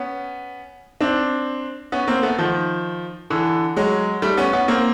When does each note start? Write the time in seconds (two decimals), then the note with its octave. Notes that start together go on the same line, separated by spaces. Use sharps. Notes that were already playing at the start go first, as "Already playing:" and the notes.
Already playing: B3 C#4
1.01 C4 D4
1.92 B3 C#4
2.08 A#3 C4
2.23 A3 B3
2.38 D#3 F3
3.30 D3 E3
3.77 F#3 G#3
4.22 G3 A3
4.37 B3 C#4
4.53 B3 C#4
4.68 A#3 C4